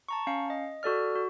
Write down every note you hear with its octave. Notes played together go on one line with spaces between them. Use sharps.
A5 A#5 C#6
C#4 F5 C#7
D#5
F#4 A4 D5 F6
F#4